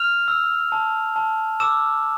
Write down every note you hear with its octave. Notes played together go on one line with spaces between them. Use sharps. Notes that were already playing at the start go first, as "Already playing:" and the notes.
Already playing: F6 F7
E6
A5
A5
D6 E6 E7